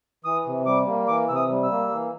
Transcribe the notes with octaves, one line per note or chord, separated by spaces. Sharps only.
E3 D#6
C3
G3 D6
A#3
E3 D6
C3 E6
D#6
G3
E6
A#3
E3